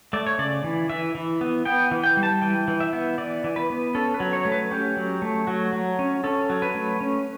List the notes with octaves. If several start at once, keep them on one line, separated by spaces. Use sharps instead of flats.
A3 D5
C#5
C#3 D5
E3
E3 E5
E3
B3
B3 G5
E3
G5
G3
A5
E3 G5
E3
E5
B3
E3 D5
E3
B4
B3
C#4 A4
B4
F#3
C#5
A3
B4
C#4 G4
F#3
A3
F#3 F#4
F#3
C#4
C#4 A4
F#3
B4
A3
C#4